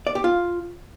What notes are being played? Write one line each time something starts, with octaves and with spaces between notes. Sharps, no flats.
D5
G4
F4